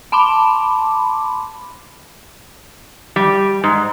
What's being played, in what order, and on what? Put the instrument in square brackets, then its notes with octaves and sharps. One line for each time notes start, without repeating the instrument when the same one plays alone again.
[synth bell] A5 B5 C6 D6
[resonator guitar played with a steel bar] G3
G#2